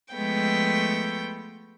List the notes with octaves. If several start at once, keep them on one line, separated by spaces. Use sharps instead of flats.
F3 G#3 A3 B3 G5